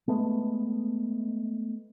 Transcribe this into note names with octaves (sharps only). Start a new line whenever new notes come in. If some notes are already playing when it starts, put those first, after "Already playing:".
G#3 A3 B3